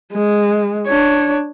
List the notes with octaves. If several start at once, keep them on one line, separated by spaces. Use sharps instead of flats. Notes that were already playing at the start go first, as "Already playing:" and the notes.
G#3
D4 C#5